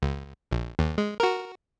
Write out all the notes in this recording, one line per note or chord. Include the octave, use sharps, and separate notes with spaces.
C#2
A#1
D#2
G#3
F#4 A#4